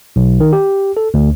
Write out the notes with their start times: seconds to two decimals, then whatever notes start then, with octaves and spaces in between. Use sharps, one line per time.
0.16 B1
0.40 D#3
0.53 G4
0.97 A4
1.14 D2